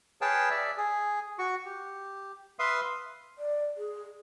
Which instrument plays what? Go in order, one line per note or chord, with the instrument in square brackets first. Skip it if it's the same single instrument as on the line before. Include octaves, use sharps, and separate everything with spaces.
[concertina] G#4 B4 C#5 F5 G5 A5
D5 E5
G#4
F#4 C#6
G4
B4 E5 F5 C6 D#6
[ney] D5
G#4